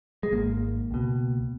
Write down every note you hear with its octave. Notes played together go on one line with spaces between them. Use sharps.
G#3
G#1 G#2 A#3
C#2 B2